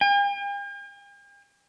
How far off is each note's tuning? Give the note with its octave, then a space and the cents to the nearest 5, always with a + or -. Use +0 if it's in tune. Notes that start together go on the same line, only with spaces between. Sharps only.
G5 +45